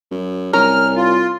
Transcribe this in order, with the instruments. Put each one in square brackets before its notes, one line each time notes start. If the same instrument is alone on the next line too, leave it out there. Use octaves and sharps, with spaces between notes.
[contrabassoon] F#2
[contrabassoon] C2 [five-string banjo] C#4 A#4 [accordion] F6
[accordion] F4